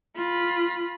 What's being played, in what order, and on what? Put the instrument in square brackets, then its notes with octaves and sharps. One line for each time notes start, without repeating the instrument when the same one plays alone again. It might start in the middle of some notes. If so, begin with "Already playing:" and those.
[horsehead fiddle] F4 B5